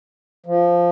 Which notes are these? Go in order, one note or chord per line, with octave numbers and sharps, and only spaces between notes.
F3